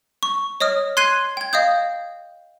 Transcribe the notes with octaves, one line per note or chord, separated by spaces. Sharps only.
C#6
C#5 D#5 D#6 F6
C6 F#6 G#6 C7 D#7
G5 G#6
D#5 F5 D#6 G6